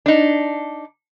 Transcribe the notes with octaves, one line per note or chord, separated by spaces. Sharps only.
D4 D#4